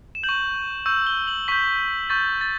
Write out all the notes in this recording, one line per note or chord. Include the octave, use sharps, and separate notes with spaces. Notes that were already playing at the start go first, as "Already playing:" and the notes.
E7
G6 F#7
C#6
C#6 E6 G6
G7
F#7
C#6 G6 B6
C#6 G6 A6
A6